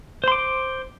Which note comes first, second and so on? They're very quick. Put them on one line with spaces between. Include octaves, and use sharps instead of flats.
C5 C6 D6